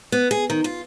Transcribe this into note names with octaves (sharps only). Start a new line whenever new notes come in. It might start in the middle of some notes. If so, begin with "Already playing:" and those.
B3
G#4
D#3
F4